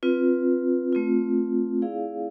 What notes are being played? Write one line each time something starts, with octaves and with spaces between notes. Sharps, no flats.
C4 F4 B4
A3 C4 F4
E4 G#4 D5 F5